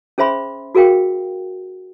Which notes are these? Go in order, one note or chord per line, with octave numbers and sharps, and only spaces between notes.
C#4 G#4 C5 E5 B5 C6
F#4 G#4 A#4 F5 G5